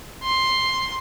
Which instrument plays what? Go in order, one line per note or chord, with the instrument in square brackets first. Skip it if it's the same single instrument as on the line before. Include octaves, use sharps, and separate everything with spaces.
[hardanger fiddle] C6